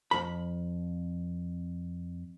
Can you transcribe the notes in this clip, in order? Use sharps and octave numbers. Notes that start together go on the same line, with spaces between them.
F2 B5